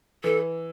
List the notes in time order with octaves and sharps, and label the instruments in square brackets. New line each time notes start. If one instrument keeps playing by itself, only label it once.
[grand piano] E3 [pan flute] A4